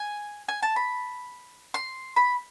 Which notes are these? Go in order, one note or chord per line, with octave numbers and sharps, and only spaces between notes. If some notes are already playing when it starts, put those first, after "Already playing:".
Already playing: G#5
G#5
A5
B5
C6
B5